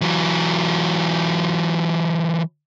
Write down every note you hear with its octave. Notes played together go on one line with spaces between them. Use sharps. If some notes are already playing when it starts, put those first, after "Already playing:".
E3 F#3